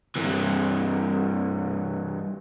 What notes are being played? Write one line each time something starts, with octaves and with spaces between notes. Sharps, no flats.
G2 E3